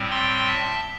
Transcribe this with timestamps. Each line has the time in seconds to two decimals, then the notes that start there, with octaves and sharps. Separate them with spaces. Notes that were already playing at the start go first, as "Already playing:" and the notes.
Already playing: A2 G3 C4
0.10 G5 C6
0.47 E5 A5